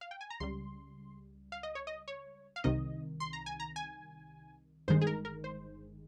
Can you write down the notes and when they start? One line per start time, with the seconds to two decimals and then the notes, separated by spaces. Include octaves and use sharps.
0.01 F5
0.11 G5
0.21 G#5
0.30 A#5
0.40 C#2 C#3 G3 C6
1.52 F5
1.63 D#5
1.75 C#5
1.87 D#5
2.08 C#5
2.56 F5
2.64 C2 C3 D#3 D#5
3.20 C6
3.33 A#5
3.46 G#5
3.60 A#5
3.76 G#5
4.88 G1 G2 D#3 G#3 C5
5.01 G#4
5.07 A#4
5.25 A#4
5.44 C5